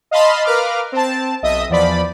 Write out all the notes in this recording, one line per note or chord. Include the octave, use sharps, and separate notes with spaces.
D#5 F5 A5 B5 C6
A#4 B4 F5 D6 F6
C4 A5
B1 D#5 E5 D#6
E2 F3 D5 B5